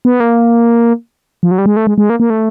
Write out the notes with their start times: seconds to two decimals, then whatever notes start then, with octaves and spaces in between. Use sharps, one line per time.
0.05 B3
0.20 A#3
1.43 F3
1.51 F#3
1.58 G3
1.66 G#3
1.77 A3
1.87 G#3
1.98 G#3
2.10 A#3
2.20 A#3
2.30 A3